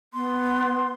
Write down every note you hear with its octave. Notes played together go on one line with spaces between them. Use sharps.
B3 C6